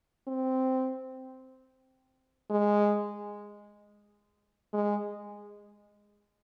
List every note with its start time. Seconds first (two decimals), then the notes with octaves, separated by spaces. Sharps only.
0.27 C4
2.50 G#3
4.73 G#3